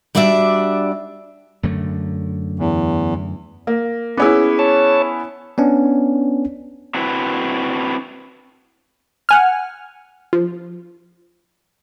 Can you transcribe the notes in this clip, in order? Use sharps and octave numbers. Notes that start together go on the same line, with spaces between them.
G3 D4 F#4 D5 E5
F#2 D3 A3
E2
A#3
B3 C#4 E4 G#4 D6
C#5 A5
B3 C#4 D4
C4 D4 E4 F#4 B4
F#5 G#5 F6
F3